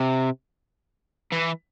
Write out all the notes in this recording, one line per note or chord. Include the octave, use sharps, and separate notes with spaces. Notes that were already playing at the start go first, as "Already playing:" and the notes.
Already playing: C3
E3